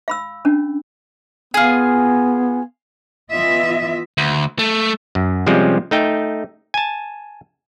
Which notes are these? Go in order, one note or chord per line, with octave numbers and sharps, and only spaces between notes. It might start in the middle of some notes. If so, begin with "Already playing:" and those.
F5 B5 E6
C#4 D4
B3 F4 G#4
E3 B3 F4 D#5 E5
D2
A3
F#2
C3 F3 G3 G#3 C4 C#4
A3 D#4 G5
G#5 A5